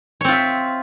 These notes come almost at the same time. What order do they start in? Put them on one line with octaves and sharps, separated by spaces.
C#5 C4 F4 E5